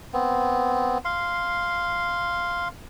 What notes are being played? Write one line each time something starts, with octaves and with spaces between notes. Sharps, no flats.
B3 C4
F5 C6